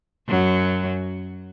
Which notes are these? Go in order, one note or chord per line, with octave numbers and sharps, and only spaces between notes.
F#2 F#3